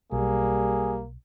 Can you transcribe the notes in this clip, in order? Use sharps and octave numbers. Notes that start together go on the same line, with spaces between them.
B1 G3 A#3 G#4